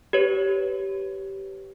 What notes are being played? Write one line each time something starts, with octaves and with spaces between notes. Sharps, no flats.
G4 B4 C#5